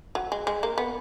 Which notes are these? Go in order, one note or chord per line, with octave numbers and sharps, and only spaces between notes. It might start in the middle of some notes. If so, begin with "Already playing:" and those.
F#3
G#3
G#3
A#3
B3